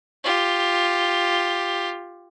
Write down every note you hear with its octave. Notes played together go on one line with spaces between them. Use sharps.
F4 G4